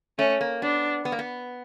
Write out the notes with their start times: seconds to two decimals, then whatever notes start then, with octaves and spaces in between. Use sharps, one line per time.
0.19 A3 C#4
0.41 A#3
0.62 B3 D4
1.05 B3
1.12 A#3
1.19 B3